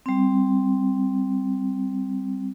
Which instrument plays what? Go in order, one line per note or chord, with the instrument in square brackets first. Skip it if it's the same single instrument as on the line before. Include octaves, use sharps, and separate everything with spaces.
[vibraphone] G3 C4